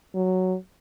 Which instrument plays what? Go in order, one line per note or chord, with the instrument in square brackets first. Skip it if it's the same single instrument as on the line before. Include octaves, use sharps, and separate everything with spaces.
[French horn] F#3